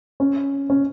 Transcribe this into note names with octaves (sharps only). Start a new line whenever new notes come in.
C#4
C#4